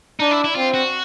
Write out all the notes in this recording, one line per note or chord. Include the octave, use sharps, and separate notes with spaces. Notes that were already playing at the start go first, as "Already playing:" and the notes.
D4 D#4
E4
E4
C4 F4
F#4